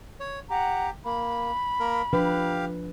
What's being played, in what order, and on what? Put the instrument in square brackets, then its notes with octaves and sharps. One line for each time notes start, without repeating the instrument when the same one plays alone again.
[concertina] C#5
[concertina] G4 [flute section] F#5 A#5
[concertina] A#3 [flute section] B5
[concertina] A#3 A#4
[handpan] F3 D4 B4 [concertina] G4 F5